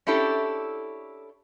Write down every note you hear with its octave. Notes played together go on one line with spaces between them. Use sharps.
C#4 D4 E4 G4 A4